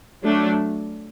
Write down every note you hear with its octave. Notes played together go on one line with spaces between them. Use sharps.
F#3 A3 D4